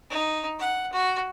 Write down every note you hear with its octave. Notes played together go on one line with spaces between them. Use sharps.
D#4
F#5
F#4